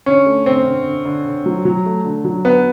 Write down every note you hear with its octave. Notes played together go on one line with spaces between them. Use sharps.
D3 C#4
A3
D3 C4
D3
D3
D3
D3
F#3
F#3
A3
D3
F#3
D3 B3